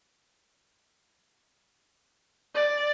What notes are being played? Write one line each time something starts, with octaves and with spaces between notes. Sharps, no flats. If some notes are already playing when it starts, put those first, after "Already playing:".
D5